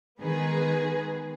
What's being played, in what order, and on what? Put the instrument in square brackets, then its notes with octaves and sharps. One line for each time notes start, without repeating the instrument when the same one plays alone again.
[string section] D#3 G#3 B3 G#4 B4